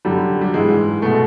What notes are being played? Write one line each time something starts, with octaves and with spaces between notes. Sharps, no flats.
F#2 D3 G3
G3
G#2 E3 G#3
B2 A3